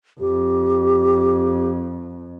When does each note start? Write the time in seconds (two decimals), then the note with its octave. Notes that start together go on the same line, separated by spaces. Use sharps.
0.20 F2 G4